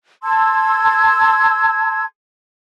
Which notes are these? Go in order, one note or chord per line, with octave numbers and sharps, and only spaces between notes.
A5 C6 E6 G#6